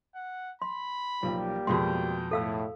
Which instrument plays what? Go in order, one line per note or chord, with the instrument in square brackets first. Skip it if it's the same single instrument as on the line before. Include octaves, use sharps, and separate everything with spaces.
[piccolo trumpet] F#5
[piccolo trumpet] B5 [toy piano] C6
[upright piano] B1 F3 [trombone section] G3 A#3 G4
[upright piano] F2 B2 G#3 [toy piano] F#4 C6 [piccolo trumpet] G5
[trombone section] A2 [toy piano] A4 F5 E6